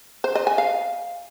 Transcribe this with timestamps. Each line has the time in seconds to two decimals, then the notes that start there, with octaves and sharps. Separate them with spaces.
0.24 C5
0.35 D#5
0.47 G#5
0.58 F5